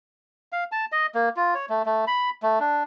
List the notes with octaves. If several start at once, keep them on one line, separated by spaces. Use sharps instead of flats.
F5
A5
D#5
A#3
F4
C#5
A3
A3
B5
A3
D4